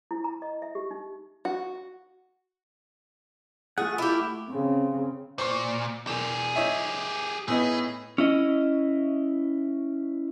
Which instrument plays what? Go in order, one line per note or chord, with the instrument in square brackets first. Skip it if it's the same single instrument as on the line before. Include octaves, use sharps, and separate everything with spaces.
[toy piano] E4
A#5
D#5
E5
G4
D#4
[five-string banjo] F#4
[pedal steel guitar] A3 F4 F#5 [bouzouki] G#4
[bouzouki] E4 G4
[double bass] C#3 C4
[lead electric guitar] A#2 [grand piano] C5 C6 C#6
[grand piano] E1 E7 [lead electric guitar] G4 G#4
[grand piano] D#4 C#5 E5
[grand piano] A2 B3 D#4 [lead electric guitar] G#4
[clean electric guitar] C#4 E4 D#5